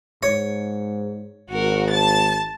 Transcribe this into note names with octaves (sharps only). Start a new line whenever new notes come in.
G#2 C#5
G#1 F#4 A#4
A5 A6